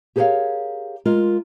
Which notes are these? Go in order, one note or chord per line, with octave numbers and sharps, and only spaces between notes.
G4 G#4 A#4 B4 C#5 F5
G#3 F4 A#4